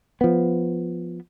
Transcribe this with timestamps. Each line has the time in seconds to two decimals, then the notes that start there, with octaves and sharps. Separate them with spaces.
0.21 F3 B3